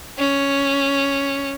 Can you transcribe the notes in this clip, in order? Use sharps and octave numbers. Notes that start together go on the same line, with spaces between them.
C#4